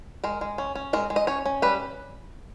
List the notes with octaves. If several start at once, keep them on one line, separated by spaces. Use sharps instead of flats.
G#3 A#4
G#3
C#4
C#4
G#3 A#4
G#3
D#5
C#4 C#5
C#4
G3 B4